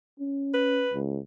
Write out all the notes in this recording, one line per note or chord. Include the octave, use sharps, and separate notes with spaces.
C#4
B4
C#2